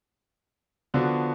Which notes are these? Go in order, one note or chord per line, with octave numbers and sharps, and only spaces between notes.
D3 F3 B3 D4 F#4